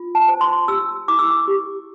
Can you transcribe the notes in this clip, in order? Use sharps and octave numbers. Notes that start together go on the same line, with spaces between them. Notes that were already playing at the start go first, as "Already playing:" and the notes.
Already playing: F4
A5
C5
C6
G4 E6
E4 D6
E6
D6
G4